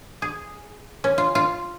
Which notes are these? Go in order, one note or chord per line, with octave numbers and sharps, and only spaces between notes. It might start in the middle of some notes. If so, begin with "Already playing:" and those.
G#4
C#4
F4
F4